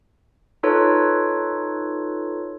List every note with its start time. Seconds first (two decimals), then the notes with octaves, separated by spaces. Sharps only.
0.63 D#4 F4 A4 B4 C#5